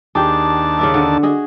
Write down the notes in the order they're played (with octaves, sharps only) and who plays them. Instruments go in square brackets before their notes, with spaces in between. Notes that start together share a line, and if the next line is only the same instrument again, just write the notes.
[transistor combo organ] D#2 D4 A5 [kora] G4 G#4
[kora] C#3 D5 E5
D3
F#4 G#4 D#5